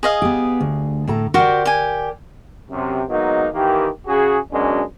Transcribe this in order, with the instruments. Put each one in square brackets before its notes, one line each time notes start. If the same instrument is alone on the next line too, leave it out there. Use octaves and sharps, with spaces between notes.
[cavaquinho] G#4 D#5 F5
[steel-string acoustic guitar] B3 G4
D2
A2 A4 A#5
[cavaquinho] F#4 G4 C5 [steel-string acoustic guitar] A#4 D5
[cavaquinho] G4 G#5
[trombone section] F#2 C3
F#3 G#3 A#3 B3 D#4
D#3 E3 A#3 G4
C#3 F#4 G#4
F#2 B2 G#3 C#4 D4